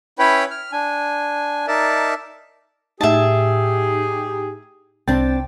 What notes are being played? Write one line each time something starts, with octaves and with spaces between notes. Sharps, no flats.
C#4 E4 B4 C#5 G5 B5
F6
D4 G#5
D#4 A#4 D5 E5 A5
A2 D#4 G4 G#4 E5 A5
C2 C4 D4 G5 A6